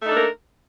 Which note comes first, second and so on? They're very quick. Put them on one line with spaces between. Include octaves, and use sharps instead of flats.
A3 D#4 A4 D4 A#4